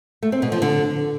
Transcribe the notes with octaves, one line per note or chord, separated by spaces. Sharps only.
A3
C4
B2
F3
D3